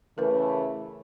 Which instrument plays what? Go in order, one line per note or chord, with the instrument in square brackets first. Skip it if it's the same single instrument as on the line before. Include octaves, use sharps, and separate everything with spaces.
[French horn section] C#3 E3 A3 [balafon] A#4 B4